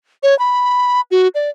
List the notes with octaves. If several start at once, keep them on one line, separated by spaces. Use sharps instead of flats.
C#5
B5
F#4
D5